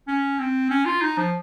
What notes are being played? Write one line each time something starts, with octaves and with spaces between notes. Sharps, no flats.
C#4
C4
C#4
F4
D#4
F3